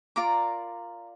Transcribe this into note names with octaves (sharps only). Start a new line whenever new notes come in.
F4 A#4 D5 A#5 D6